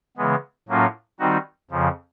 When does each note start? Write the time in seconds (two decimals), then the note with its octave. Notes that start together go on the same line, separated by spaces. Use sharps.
0.17 C#3 E3 G#3 B3
0.68 A2 F#3 A#3 C#4 F4
1.19 D#3 G3 C4 D#4 F#4
1.71 F2 C#3 F3